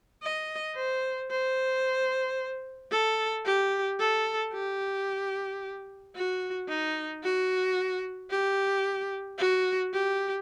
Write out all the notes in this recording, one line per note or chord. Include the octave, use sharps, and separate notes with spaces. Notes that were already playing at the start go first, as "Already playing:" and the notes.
D#5
C5
C5
A4
G4
A4
G4
F#4
D#4
F#4
G4
F#4
G4